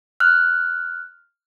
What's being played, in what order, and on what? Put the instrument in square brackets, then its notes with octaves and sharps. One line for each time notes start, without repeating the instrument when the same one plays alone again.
[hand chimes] F6 F#6